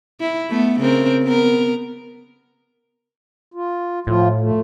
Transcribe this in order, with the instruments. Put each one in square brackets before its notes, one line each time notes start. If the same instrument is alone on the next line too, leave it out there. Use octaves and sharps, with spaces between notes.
[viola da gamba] E4
A3 B3
C#3 C4 A#4
B3 A#4
[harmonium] F4
[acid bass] A2 [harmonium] F3 F4
[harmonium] A3